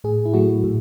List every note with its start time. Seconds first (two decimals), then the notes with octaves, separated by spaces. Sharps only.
0.04 A2 G#4
0.26 E4
0.34 F#3 A3 F#4
0.64 A2